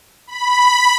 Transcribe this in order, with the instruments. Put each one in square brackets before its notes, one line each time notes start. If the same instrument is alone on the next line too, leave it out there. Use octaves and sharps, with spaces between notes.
[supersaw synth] B5